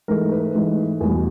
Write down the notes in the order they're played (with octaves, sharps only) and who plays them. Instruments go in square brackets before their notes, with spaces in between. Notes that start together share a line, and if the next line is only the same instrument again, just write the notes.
[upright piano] G#2 E3 A3 A#4
B4
G#2 E3 A3
E2 B2 G3